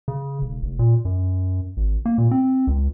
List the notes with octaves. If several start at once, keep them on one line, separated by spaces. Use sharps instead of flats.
C#3
E1
F1
A#2
F#2
G#1
A#3
A#2
C4
C#2